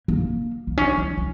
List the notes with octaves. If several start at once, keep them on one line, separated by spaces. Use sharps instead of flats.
A#3
A#3
C#4
E4
C#4